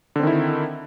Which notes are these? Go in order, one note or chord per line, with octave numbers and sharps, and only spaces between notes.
D3 D#3 C4 E4